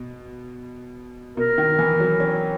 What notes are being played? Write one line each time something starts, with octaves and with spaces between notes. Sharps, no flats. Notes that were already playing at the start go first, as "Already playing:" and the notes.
Already playing: B2
B2 A#4
D#3
E3
F#3
C#4